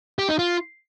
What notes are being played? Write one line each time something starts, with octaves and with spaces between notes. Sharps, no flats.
G4
D#4
F4